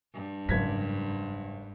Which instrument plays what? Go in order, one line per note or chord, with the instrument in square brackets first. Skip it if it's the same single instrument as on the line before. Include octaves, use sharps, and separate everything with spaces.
[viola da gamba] G2
[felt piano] F#1 G#6 B6 [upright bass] G#2